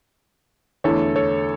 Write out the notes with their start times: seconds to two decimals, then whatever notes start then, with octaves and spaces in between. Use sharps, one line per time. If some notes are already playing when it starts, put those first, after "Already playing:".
0.84 E2 D3 A3 A4 C#5
1.16 A4 C#5